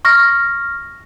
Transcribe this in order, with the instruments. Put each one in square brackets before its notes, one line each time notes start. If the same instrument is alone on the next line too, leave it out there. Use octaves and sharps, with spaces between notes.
[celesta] C#6 F6 A#6